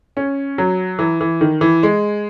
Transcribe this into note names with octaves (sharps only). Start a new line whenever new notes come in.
C#4
F#3
E3
E3
D#3
E3
G#3